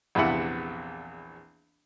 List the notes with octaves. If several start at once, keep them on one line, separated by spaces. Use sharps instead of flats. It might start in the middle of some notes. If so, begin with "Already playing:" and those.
A#1 E2 C3 E3 E5 F#5